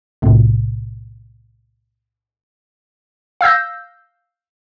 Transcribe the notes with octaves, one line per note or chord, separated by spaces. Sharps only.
B1 A2 C3
F5 E6 G6 A#6